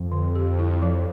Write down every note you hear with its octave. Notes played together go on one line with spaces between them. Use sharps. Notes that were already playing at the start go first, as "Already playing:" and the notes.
Already playing: F2
D3
G4
E4
F3